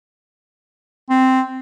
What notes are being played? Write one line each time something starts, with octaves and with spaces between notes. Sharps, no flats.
C4